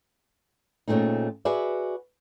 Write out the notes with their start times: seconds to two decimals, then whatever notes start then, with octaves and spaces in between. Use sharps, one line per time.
0.88 A#2 C#3 F3 A3 C4 D#4
1.45 F#4 G#4 B4 D5 E5